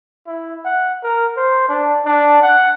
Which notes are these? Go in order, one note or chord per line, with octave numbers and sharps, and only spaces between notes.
E4
F#5
A#4
C5
D4
D4
F#5